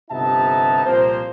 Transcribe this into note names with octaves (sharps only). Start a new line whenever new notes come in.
G1 C3 B3 D#4 E5 A5
C2 A#2 F3 A#3 C4 C5